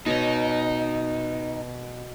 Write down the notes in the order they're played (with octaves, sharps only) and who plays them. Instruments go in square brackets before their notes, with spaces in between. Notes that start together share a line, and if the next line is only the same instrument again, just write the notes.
[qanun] B2 C#5 [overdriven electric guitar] D#4